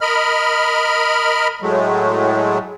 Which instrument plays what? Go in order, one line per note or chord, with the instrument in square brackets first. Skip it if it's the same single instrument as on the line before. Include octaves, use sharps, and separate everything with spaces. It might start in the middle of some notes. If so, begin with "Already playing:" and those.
[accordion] A#4 D#5 B5 F6
A2 F#3 G#3 A3